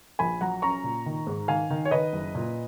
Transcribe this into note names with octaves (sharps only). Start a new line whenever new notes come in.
A#1 G#5 B5
F#3 F#5 A#5
C#4 A#5 C#6
A#2
D#3
G#2
D#3 F5 G#5
D#3
C#5
D#3 B4 D#5
F#1
A#2